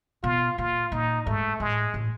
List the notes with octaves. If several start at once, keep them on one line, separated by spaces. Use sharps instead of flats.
B2 F4
A#2 F4
A#2 D#4
G#2 A3
A2 G#3
A2